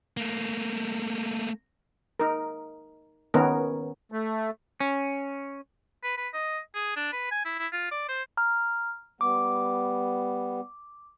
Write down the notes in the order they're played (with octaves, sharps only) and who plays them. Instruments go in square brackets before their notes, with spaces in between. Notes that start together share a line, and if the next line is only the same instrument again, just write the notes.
[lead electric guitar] A3 A#3
[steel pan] D#4 A#4
D#3 B3 C#4 A#4
[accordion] A3
[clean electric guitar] C#4
[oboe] B4
B4
D#5
G#4
D4
B4
G#5
E4
E4
F4
D5
C5
[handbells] A#5 F6
[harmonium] G3 B3 [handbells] D6